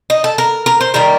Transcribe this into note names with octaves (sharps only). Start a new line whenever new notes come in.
D#4
A4
A#4
A#4
C5
D#3 G3 A#3 A#4